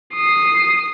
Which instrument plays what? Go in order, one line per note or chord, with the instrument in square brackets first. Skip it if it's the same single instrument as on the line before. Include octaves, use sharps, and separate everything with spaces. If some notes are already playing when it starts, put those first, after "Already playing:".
[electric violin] D#6 C7